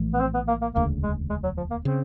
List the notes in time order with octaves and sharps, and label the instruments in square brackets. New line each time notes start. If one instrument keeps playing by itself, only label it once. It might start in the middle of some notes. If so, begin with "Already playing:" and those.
Already playing: [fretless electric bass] A#1 A2 E3 A3
[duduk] B3
C4
B3
A#3
A#3
[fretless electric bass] E1 D2 C#3 [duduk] A#3
[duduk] G#3
G#3
F#3
F3
A#3
[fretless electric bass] C#3 [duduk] C4